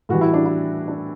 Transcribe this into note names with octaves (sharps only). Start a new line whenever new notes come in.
A2 E3 G3 F#4
E4
D4
E4
D4